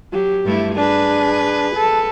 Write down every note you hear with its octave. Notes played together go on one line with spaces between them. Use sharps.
F#3 G4
G2 A3 E4
D4 G#4 B4
A4